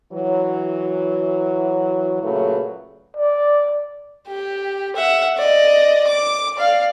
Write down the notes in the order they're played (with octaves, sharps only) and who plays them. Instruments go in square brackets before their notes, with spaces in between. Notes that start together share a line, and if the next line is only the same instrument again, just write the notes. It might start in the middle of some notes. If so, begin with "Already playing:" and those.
[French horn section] E3 F#3
A#2 C#3 F#3 A3 B4
[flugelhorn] D5
[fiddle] G4
E5 F#5
D5 D#5
D6
D5 F5